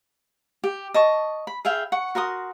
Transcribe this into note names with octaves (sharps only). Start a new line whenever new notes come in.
G4
D#5 A5 C#6
B5
G#4 E5 F5 G5
F#5 C#6
F#4 A#4 C6 D#6